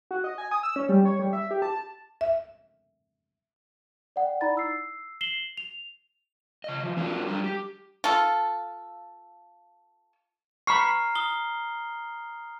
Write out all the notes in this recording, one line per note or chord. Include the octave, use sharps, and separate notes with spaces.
F#4
D#5
G#5
D#6
E6
C#4
G3
C#5
G3
E5
G4
A5
E5
D5 F#5 G5
D#4 E4 D5 A#5 B5 A6
E6 C7
C7 E7 F#7 G7
F7
C#3 D#5
E3 F3
C4 D4 F4 F#4 A#4
G3 D4 A#5
G4
F4 A4
A#5 B5 C#6 F6 C7
D#6 G7